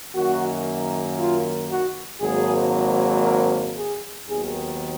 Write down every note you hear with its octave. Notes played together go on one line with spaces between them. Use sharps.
F#2 D#3 A#3 F#4
F4
F#4
G#1 G#2 F#3 A#3 G#4
A#4
G#4
D#2 D#3 F#3 B3 G#4